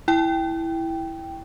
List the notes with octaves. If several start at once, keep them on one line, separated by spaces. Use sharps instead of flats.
E4 G5